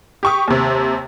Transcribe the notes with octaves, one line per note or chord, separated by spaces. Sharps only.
G4 C#6 D#6
D#2 C3